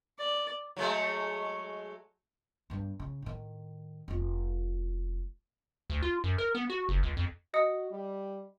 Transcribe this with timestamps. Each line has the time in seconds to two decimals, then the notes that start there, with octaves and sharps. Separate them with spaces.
0.18 D5
0.76 F#3 G#3 A3
2.70 G2 G3
3.00 C#3
3.22 A2 D#3
4.08 F1 F4
5.90 D2
6.02 F4
6.24 F#2
6.38 A#4
6.55 B3
6.70 F#4
6.89 F#1
7.03 C#2
7.17 F2
7.54 F#4 D#5 D#6 C#7
7.90 G3